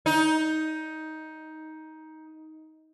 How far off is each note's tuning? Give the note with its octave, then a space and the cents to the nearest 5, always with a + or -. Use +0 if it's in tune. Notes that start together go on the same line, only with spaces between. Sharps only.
D#4 +15